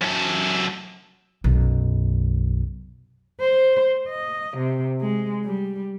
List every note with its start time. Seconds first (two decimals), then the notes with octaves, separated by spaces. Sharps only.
0.02 F#2 A4
1.44 B1 F#2
3.40 C5
4.09 D#5
4.57 C3
5.01 G#3
5.44 G3